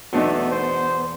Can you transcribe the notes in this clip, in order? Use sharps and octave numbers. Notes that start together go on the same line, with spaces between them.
E2 B2 F#3 A3 B3 C4 D4 D#4
C5